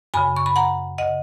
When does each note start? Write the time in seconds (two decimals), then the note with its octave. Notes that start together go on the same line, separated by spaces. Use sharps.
0.14 F#2 C#3 G#5 B5
0.36 C#6
0.46 B5
0.56 F#5 A#5
0.98 C#3 D#5 F#5